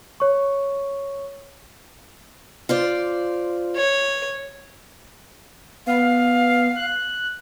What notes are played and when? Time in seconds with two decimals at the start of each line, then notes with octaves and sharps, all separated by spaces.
0.20 C#5 C#6
2.69 F4 C5 D5
3.76 C#5
5.87 B3 F5
6.76 F#6